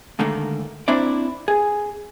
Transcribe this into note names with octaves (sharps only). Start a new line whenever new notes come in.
G#2 D3 D#3 A3 A#3
A#3 C4 D4 E4 D5
G#4